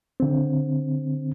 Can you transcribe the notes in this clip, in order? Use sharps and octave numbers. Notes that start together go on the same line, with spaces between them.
D3 C4